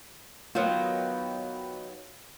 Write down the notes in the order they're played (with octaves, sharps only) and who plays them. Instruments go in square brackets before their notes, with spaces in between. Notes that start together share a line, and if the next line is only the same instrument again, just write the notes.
[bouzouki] D#3 F#3 B3 [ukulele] F4